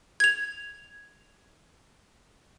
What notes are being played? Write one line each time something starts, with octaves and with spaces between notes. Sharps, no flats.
G#6 F7